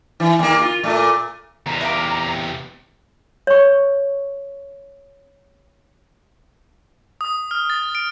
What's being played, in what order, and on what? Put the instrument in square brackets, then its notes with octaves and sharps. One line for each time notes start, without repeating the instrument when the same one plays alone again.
[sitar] E3
D#2 A#3
F4
A#2 A3
[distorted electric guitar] E2 C3 [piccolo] A#5
[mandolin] E5 F5 D6
[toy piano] C#5 C#6
[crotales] D#6
F6
A6
D7